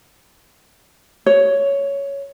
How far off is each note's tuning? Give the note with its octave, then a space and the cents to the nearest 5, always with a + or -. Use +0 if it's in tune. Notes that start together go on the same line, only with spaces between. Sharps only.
C#5 +10